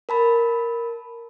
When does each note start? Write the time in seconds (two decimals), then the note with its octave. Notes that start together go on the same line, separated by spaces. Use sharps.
0.09 A#4 A5 B5